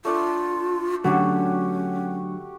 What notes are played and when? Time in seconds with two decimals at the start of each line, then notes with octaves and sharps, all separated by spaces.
0.05 A3 D4 F4 A4
1.04 D3 F#3 A3 C#4 F#4 G4